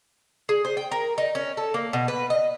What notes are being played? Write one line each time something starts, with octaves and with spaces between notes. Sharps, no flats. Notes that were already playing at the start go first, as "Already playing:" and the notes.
G#4
C5
G5
A#4
D#4
C#4
A4
A#3
B2
B4
D#5